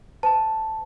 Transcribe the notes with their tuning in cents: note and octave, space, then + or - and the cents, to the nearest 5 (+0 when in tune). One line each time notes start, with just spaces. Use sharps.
C5 -35 A5 +0